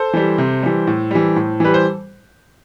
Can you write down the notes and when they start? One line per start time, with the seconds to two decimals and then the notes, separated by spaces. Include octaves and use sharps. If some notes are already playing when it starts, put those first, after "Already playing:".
Already playing: A4 C5
0.13 E3 G3
0.38 C3
0.63 E3 G3
0.87 A2
1.11 E3 G3
1.36 A2
1.60 E3 G3 B4
1.74 C5